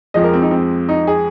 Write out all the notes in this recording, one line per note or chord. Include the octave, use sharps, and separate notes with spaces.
F2 F3 G#3 D#5
A#4
C4
D#4
C4
D#4
G#4